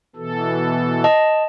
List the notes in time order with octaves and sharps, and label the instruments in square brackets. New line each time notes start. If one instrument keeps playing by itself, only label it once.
[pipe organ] B2 E3 A4
[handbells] D#5 A5